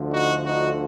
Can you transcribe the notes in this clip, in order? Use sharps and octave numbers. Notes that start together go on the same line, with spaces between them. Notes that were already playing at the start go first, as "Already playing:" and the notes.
Already playing: D2 D3 F3
D#4 F#4
D#4 F#4